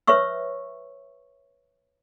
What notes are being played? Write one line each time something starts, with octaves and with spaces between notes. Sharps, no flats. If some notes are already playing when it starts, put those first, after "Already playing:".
B4 C#5 E5 C#6 E6